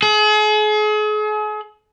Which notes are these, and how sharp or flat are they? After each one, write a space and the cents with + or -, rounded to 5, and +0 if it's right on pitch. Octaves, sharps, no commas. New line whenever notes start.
G#4 +40